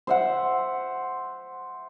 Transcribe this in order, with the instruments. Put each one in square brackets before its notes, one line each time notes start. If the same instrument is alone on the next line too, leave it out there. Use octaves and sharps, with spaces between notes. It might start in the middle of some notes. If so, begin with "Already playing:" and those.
[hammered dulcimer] C5 E5 F#5